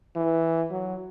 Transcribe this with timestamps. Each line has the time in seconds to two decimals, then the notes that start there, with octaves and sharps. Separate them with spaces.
0.16 E3
0.71 F#3